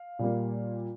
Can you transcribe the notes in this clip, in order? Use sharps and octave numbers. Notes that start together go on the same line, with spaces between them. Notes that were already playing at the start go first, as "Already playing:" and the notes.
Already playing: F5
A#2 G3 A#3